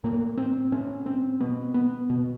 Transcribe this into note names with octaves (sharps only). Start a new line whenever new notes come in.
A2 A#3
C4
A2 C#4
C4
B2 B3
B3
B2